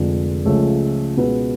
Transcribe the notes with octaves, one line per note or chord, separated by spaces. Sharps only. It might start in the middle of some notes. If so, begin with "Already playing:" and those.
Already playing: F1 F2 D3 F3 G#3
C#2 C#3 F3 A3
C#2 B2 B3